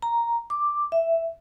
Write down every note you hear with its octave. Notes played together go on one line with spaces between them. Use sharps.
A#5
D6
E5